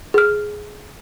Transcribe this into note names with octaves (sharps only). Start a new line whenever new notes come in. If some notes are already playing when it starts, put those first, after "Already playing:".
G#4 F6